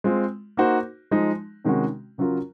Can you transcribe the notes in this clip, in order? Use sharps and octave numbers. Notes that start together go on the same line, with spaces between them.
G#3 C4 F4
A#3 D#4 F#4 C5
F3 G#3 D#4
C3 D#3 G#3 C#4 F#4
C#3 F#3 C#4 F4 A#4